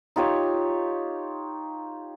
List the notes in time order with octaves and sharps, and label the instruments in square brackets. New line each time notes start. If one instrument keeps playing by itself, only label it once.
[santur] D#4 F4 G4 C#5